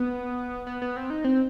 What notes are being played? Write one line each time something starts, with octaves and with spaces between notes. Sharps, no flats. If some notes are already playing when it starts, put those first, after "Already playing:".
Already playing: B3
B3
B3
C4
D#4
C4